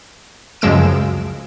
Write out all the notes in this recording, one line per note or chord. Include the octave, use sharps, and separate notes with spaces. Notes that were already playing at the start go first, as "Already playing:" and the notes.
C#2 F#2 F3 G#3 E6 D7